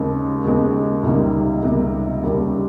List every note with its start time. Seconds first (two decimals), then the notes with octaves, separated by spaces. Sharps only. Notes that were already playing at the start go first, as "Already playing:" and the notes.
Already playing: D#2 C#3 G#3 C4
0.44 D#2 C#3 G#3 C4
1.03 C#2 C3 D#3 G3 A#3
1.63 C#2 C3 D#3 G3 A#3
2.22 D#2 C#3 G3 A#3